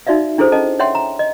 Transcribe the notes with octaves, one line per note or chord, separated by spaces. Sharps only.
D#4 F#4 D5 E5 F5
D4 E4 G#4 A4 C5
C#4 A4 D#5 A5
C#5 E5 F#5 G5 C6
A#5
D#5